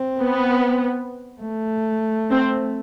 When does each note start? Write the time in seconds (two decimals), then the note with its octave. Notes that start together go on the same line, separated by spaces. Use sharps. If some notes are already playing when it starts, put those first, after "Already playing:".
Already playing: C4
0.20 B3
1.41 A3
2.31 C4